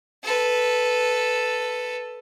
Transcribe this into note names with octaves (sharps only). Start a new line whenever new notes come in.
A4 B4